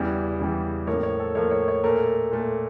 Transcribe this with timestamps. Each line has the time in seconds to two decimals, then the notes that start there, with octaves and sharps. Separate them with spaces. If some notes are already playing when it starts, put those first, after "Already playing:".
Already playing: E2 C#3 E3 G3
0.40 E2 C#3 E3 G3
0.87 A2 F3 A#3 C#5
1.03 C#5
1.20 A4
1.35 A2 F3 A#3 C#5
1.51 C#5
1.68 C#5
1.84 A#2 A3 A#4
2.31 A#2 A3